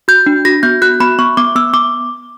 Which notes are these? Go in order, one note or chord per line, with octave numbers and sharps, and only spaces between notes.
F#4 G6
D4
F#4 A#6
B3 G6
F#4 F#6
B3 B5
B3 C#6
B3 D6
B3 E6
B3 D6